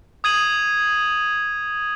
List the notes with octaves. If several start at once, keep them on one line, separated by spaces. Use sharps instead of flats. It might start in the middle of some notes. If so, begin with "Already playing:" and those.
D#6 G#6 D#7 F#7